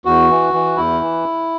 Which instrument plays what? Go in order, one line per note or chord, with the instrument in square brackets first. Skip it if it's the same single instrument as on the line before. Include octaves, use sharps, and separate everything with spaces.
[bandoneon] E2 F#4
E3
E3
E2 E4
E3